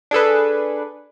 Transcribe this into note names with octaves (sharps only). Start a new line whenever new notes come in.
D4 G#4 A4 B4